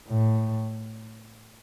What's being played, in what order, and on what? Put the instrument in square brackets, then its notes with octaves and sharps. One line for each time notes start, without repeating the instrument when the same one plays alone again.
[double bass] A2